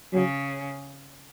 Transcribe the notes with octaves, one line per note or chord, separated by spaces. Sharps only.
C#3 F#3 C#4